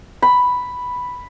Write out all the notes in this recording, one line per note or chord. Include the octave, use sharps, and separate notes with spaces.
B5